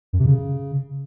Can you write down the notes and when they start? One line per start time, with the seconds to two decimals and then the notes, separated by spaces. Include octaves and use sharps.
0.13 F#2
0.19 C3
0.26 C#3